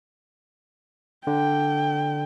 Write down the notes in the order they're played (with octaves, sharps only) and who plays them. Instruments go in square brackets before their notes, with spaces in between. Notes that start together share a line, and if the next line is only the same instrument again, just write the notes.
[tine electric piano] D3 [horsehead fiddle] G5